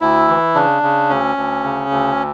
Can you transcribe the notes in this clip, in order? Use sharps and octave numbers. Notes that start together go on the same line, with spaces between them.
D2 E4
E3
C#3 D4
C#3
D2 C#4
D2
C#3
D2